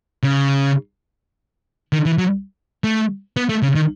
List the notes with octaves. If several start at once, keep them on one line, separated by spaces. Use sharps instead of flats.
C#3
D#3
E3
F#3
A3
B3
A3
C#3
D#3